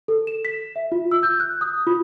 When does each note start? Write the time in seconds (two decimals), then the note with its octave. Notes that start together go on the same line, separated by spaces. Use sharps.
0.08 A4
0.27 E7
0.45 B6
0.76 E5
0.92 F4
1.11 E6
1.23 G6
1.40 F#6
1.61 D#6
1.87 F4